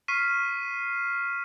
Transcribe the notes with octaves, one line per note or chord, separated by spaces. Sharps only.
C#6 F6 B6 C7 D#7